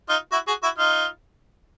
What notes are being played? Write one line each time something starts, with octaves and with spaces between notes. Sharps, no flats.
D#4 F4
E4 F#4
F#4 G#4
E4 F#4
D#4 F4